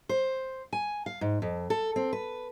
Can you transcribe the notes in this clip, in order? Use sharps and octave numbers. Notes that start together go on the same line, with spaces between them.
C5
G#5
F5
G#2
F2
A4
C4
B4